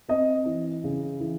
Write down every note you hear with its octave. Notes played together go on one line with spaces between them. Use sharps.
C4 D#5
E3
C#3
E3